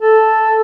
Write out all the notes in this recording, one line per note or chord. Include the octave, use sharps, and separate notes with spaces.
A4